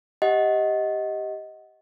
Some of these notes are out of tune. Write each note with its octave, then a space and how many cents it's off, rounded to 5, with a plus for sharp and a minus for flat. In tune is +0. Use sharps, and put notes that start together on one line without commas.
G4 +0 D#5 +15 F#5 +0